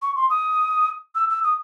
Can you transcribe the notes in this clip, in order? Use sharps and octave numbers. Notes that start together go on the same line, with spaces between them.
C#6
C6
D#6
E6
E6
D#6